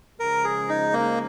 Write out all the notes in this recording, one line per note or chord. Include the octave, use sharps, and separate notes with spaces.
C#3 F3 G#3 A#4
G#4
D#4
A#3